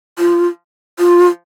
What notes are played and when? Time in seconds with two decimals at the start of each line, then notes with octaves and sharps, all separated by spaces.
0.18 F4
0.99 F4